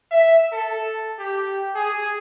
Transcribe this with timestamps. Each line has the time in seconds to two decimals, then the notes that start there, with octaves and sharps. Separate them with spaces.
0.11 E5
0.52 A4
1.19 G4
1.75 G#4